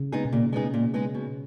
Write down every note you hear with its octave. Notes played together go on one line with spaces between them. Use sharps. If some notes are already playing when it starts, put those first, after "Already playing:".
Already playing: C#3
G#3 B3 D#4 G#4
B2
A#2 C#3
G#3 B3 D#4 G#4
A#2
G#3 B3 D#4 G#4
B2